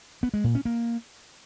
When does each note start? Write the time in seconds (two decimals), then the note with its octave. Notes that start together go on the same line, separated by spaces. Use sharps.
0.23 B3
0.34 G#3
0.44 A#2
0.55 C#4
0.65 A#3